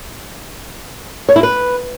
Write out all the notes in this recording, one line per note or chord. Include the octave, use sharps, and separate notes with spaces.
C#5
E4
B4